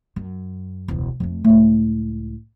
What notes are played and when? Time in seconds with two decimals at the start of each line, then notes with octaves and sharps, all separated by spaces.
0.16 F#2
0.88 E1 C#2
1.20 F2 A3
1.44 C#2 A2